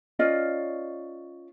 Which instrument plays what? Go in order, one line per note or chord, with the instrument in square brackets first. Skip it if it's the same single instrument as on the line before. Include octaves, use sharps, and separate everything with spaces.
[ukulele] C#4 F4 D5 D#5